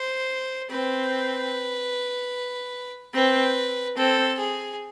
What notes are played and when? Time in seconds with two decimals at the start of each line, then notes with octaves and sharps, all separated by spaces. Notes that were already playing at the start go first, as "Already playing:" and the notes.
Already playing: C5
0.71 C4 B4
3.14 C4 B4
3.97 C4 A4
4.38 G#4